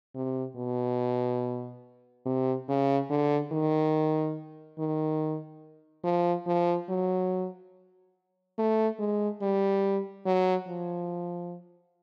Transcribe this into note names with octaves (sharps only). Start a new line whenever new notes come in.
C3
B2
C3
C#3
D3
D#3
D#3
F3
F3
F#3
A3
G#3
G3
F#3
F3